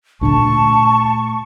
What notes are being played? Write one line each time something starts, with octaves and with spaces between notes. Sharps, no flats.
D2 A#2 D3 A3 A5 C#6